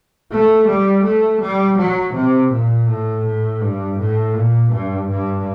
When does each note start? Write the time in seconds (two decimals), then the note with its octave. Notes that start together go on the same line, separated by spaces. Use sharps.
0.31 A3
0.68 G3
1.04 A3
1.41 G3
1.78 F#3
2.15 C3
2.52 A#2
2.89 A2
3.26 A2
3.62 G2
3.99 A2
4.36 A#2
4.73 G2
5.10 G2